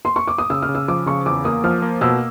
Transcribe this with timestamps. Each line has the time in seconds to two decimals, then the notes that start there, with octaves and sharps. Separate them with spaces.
0.05 C6
0.16 C#6
0.27 D6
0.38 D#6
0.50 C#3 E6
0.62 F6
0.69 C#3
0.75 E6
0.88 F3 D6
1.06 C#3 C#6
1.26 E2 D6
1.45 A#3 D#6
1.64 F3 F6
1.82 A#3
2.01 B2 E6